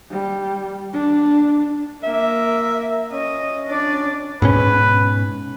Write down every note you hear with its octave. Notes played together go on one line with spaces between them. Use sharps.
G3
D4
A#3 A#4 E5
C#4 D#5
D4 D5
G#2 B2 C#4 B4